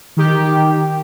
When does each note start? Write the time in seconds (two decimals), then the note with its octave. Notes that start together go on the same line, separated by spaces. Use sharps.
0.17 D#3 G4